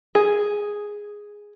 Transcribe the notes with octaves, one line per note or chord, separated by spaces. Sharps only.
G#4